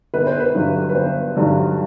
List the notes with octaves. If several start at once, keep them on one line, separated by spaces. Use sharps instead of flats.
G1 B4
C5
B4
G2 D3 F#3
B4
G1 C5
G2 D3 F#3